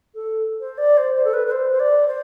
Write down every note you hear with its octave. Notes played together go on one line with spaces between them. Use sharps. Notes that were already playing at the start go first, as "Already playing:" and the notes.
A4
C5
D5
C5
C5
A4
B4
B4
C5
C5
D5
C5